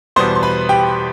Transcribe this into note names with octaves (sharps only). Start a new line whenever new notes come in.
E2 B2 G3 B3 C5 C6
C6
B4 B5
G4 G5